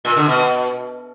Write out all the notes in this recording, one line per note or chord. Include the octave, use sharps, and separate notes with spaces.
A#2
D3
B2